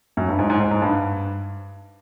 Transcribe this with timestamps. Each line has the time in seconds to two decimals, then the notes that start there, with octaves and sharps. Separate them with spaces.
0.17 F#2
0.28 G2
0.39 G#2
0.50 G#2
0.60 G#2
0.71 G#2
0.82 G2